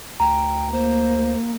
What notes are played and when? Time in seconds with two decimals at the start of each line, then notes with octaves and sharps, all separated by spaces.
0.20 D2 G5 A#5
0.72 A#3 C5